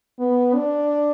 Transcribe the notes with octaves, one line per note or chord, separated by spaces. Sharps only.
B3
D4